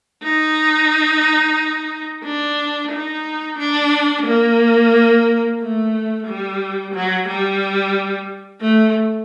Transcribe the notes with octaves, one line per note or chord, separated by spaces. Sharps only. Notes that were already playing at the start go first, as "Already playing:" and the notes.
D#4
D4
D#4
D4
A#3
A3
G3
F#3
G3
A3